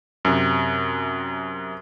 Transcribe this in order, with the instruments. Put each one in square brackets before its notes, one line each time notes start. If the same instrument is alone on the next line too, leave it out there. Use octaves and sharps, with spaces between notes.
[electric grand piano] F#2 C3